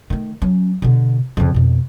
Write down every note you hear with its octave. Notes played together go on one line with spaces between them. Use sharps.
D#3 A3
F#3 C#4
B2 D3
F2 C#3
F2 B2